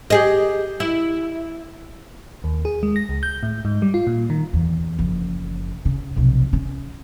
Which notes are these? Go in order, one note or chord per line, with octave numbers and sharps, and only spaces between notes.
G4 G#4 D#5
E4
D#2
G#4
G#3
A#6
C#2
G6
A2
G#2
G3
F4
A#2
D#3
E2
F#1 F3
C#3
F1 B1
C#4